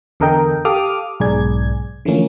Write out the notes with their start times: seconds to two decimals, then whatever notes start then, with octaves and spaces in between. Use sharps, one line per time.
0.20 E2 D3 A4 A#4 D#5 G5
0.65 G4 A4 F5 D6 D#6 F6
1.20 B1 G#2 G#4 D5 G#6
2.05 D3 E3 F3 A3 A#3 C#4